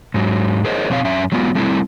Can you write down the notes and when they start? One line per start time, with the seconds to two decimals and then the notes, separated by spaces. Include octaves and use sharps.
0.14 G#2 F#3
0.65 G#4 A#4 C5 C#5 D#5
0.90 F2 B2 C4 C#5 F5
1.05 F#2 C#4 E5
1.32 F#3 G#3 B3 F4
1.55 G3 A3 C4 E4